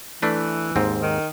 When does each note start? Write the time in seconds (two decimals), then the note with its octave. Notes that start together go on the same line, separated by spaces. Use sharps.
0.22 E3 A3 D4 B4
0.76 D#2 G#2 C4
1.03 D#3